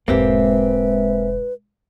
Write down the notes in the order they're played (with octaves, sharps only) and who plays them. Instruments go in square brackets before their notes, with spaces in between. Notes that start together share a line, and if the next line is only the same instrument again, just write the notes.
[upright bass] E1 G#2 [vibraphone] G#3 E5 [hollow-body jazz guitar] A#3 C4 G4 [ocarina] B4